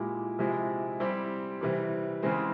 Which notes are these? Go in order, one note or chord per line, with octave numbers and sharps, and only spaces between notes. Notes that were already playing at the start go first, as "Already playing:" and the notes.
Already playing: A#2 G#3 E4 G4
C3 F3 G#3 E4 G4
G3 C4 E4 G4
C3 E3 G3
C#3 E3 G#3 C4